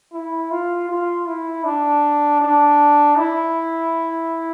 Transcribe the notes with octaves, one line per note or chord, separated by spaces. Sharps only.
E4
F4
F4
E4
D4
D4
E4